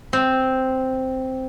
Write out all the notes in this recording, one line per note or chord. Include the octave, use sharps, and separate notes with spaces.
C4